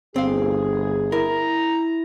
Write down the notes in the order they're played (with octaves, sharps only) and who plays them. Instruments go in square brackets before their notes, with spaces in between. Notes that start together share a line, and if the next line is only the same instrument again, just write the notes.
[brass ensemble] G1 G#4 [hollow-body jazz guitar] C4 F5
[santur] E4 [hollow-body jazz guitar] A#4 [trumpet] A#5